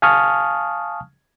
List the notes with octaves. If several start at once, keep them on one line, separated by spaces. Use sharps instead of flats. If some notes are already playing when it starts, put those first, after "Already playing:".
F5 G#5 A5 C#6 D#6 F6